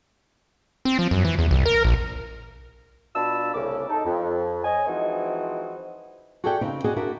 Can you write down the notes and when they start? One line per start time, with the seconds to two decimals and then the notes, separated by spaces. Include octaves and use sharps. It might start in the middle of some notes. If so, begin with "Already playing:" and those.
0.85 C4
0.99 F3
1.11 F#2
1.25 E3
1.39 E2
1.51 C2
1.66 A#4
1.84 A#1
3.15 B2 D4 F4 A5 B5 E6
3.54 C2 A2 C#3 C#4 D6
3.89 D#4 A4
4.05 F2
4.65 C#5 D#5 G#5
4.87 E3 F3 G#3 C4 D#4 F#4
6.44 F#4 G#4 A4 D5 E5 G5
6.61 C#3 C4 D#4
6.84 F#4 G#4 D5 D#5
6.96 D4 E4 F#4 A#4 E5